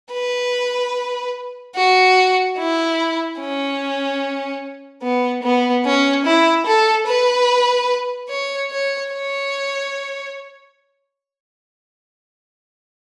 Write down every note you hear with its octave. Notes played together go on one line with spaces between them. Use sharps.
B4
F#4
E4
C#4
B3
B3
C#4
E4
A4
B4
C#5
C#5
C#5